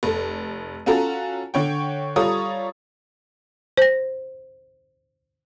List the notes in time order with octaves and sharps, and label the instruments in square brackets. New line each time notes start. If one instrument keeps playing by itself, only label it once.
[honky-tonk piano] F1 A4
C#4 F4 F#4 A4 A#5
D3 C#5 G5
G3 F4 A4 C#5 A#5 D#6
[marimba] C5 A#6